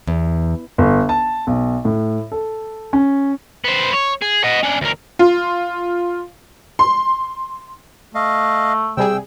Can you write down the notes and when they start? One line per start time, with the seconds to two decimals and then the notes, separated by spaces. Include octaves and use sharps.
0.07 E2
0.78 G1
1.09 A5
1.47 B1
1.85 A2
2.32 A4
2.93 C#4
3.64 B3 C5
3.93 C#5
4.22 G#4
4.43 D#5 F#5
4.63 C#4 D4
4.81 D2 A#4
5.19 F4
6.79 C6
8.15 A3 D#5 F5
8.97 C3 G3 G#4 G5 E6